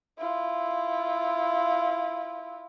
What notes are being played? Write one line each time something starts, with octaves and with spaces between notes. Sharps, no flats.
E4 F4